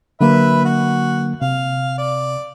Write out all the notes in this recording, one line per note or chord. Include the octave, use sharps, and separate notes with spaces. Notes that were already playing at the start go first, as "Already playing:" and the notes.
D3 F#3 A#3 B4 E5
F#4
C3 F5
D5